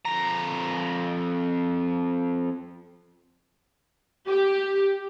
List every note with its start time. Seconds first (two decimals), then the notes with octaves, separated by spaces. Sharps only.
0.06 F2 A#5
4.27 G4